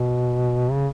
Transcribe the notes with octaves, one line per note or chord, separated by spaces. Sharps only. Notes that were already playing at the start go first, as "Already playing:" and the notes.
Already playing: B2
C#3